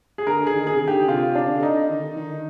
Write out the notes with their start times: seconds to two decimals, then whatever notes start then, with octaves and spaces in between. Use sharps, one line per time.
0.18 G#4
0.26 D3 A#4
0.47 G#4
0.53 D#3
0.67 G#4
0.75 C3
0.80 D3
0.88 G4
1.07 C3 F4
1.35 D4
1.48 D3
1.63 D#4
1.89 D#3
2.16 D#3